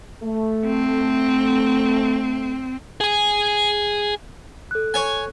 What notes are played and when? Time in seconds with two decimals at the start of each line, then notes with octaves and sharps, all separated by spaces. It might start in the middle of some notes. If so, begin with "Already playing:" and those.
0.23 A3
0.66 C4
3.01 G#4 G#5
4.71 A4 F#6
4.94 C#5 G#5